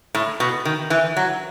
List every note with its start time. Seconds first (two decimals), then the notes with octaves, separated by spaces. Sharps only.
0.15 A2
0.40 B2
0.65 D#3
0.90 E3
1.17 F#3